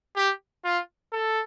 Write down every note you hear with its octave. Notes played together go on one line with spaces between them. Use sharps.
G4
F4
A4